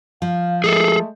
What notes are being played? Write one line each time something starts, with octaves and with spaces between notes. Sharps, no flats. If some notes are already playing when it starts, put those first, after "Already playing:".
F3 F5
G#3 A3 G#4 A4